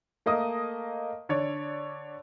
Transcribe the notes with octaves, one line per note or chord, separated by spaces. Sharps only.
A3 A#3 D#5 D#6
D3 C#5 D5